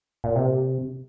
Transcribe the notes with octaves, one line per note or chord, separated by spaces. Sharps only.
A#2
C3